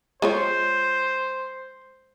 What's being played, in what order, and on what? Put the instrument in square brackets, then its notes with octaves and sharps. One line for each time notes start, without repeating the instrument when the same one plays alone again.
[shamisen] G#3 F4 C#5 [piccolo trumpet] C5